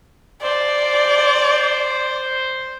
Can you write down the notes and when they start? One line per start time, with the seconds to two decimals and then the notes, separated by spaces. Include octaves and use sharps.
0.43 C5 D5